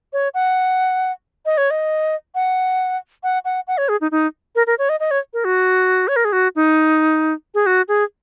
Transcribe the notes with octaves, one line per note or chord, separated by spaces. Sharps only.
C#5
F#5
D#5
C#5
D#5
F#5
F#5
F#5
F#5
C#5
G#4
D#4
D#4
A#4
A#4
C#5
D#5
D#5
C#5
A#4
F#4
C#5
A#4
G#4
F#4
D#4
G#4
F#4
G#4